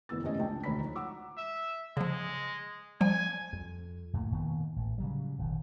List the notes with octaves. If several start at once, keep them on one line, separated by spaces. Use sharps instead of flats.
F#1 E3 B3 E6 A6
F1 G#2 C#4 D#5 G#5
C#2 D4 G5
E1 D2 C#5 A#5 B5 B6
F3 D#4
F#5 A#5 D6 E6
E5
C#3 F3 G#3
F3 G3 G#5
F2
F2 A2 A#3
E1 D#3 A#3 B3
A1
C#3 F#3 G3
D#1 G#1 D#3